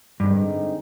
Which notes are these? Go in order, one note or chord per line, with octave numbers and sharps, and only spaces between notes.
G2 D3 G#3 C4 D#4